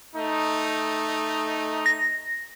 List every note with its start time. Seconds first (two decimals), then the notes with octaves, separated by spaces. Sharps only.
0.15 A3 D#4
1.86 A#6